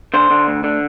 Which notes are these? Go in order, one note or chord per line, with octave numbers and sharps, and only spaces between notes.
D3 C5
D3
D2
D3